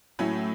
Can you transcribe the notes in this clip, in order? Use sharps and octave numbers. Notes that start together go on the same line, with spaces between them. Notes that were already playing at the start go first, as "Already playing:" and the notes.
A2 F#3 A3 C#4 E4